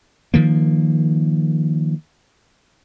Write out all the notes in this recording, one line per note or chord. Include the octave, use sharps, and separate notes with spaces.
D#3 F3 A#3